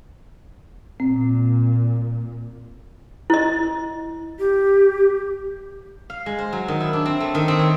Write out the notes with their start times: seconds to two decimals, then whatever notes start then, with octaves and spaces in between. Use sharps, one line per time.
1.00 A#2 C4
3.30 E4 D#5
4.39 G4
6.10 F5
6.26 G#3
6.38 C5
6.53 F#3
6.68 D#3
6.80 E4
6.93 D4
7.06 C4
7.20 A3
7.35 D#3
7.48 C4
7.59 C#5